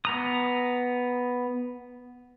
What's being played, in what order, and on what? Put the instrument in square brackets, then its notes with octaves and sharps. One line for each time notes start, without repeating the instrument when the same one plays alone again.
[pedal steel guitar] B3 A#5 D#6